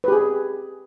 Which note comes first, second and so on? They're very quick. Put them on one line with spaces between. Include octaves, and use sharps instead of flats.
B4 G4 G#4